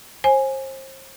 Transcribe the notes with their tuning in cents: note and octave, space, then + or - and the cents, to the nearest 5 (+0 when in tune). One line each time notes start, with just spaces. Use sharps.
C5 +35 G#5 +0